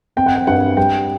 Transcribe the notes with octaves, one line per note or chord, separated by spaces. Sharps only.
C4 G5
F#5
G5
G2 F#5
G3 G5